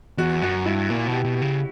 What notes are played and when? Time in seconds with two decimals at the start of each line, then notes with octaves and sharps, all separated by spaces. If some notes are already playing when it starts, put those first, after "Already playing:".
0.18 E2 F#4
0.42 F#2 F#4
0.66 G2 E4
0.89 A#2 F#4
1.07 B2 G4
1.25 B2
1.36 G4
1.42 C#3